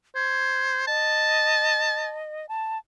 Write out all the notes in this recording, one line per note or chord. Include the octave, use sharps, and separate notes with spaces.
C5 G#6
D#5 A5
A5